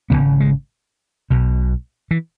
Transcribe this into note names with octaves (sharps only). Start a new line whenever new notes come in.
G#1 F#2 C#3 B3
G#3
B1 B2
E3